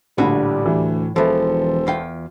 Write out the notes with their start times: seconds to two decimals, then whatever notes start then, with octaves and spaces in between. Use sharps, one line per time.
0.18 A#1 A2 D3 G3 F#4 B4
0.66 D2 E3
1.16 E1 E3 F3 A4 C5
1.87 E2 F4 G5